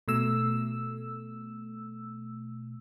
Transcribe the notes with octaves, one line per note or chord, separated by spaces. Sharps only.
B2 A3 E6